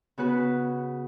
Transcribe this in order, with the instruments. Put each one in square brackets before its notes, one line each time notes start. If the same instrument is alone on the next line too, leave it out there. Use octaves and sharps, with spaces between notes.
[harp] C#3 B3 F#4 B4